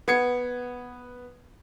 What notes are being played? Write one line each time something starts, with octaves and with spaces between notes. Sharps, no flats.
B3 G#6 C#7